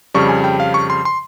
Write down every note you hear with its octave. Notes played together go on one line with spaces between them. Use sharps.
F2 C#3 G3 C#6
G#5
G5
F5
C#6
C6
C6